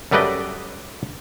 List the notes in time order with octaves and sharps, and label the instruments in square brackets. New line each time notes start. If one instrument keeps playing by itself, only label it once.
[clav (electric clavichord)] F#2 G3 A3 B4 D5 D#5